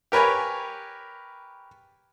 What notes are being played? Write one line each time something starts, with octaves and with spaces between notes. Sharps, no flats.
G4 A#4 B4 C#5 G#5